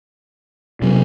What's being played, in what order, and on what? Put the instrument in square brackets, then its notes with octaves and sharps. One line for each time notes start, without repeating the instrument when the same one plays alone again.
[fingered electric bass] C3 F#3